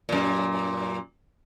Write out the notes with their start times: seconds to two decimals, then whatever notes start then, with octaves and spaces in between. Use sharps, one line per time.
0.09 F#2 A#2